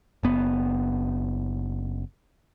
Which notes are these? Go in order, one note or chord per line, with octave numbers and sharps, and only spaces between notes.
F#1 B3